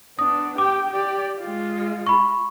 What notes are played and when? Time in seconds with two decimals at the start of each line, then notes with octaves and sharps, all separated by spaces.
0.19 B3 D4 D#6
0.58 G4 G5 D6
0.90 G4 D5
1.41 G#3 F4
2.07 B5 C#6